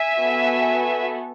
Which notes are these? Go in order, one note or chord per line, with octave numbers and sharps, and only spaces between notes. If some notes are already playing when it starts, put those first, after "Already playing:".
Already playing: E5 G#5
B3 F#4 A4